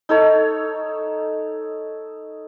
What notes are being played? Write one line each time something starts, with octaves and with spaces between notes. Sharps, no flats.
D#4 A4 C#5